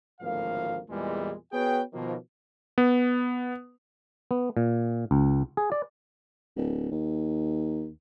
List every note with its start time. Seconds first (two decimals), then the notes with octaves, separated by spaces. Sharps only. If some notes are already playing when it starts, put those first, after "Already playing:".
0.21 G#1 D2 A2 F3 A#3 F5
0.90 E2 A#2 E3 G3 G#3
1.53 B3 F#4 G#4 B4 C#5 G5
1.93 B2 D#3 F3 A#3
2.78 B3
4.31 B3
4.57 A#2
5.11 C#2
5.57 G#4
5.72 D5
6.56 D1
6.92 D#2